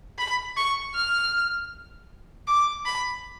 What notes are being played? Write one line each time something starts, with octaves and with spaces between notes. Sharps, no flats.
B5
C#6
F6
D6
B5